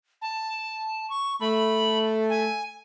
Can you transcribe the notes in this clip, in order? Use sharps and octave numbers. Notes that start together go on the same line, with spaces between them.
A5
C#6
A3 B5
G#5